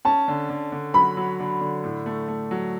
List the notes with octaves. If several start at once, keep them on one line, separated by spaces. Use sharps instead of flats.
C#4 A5
D3
D3
D3
F#3 B5
F#3
D3
D3
A2
A3
A3
F#3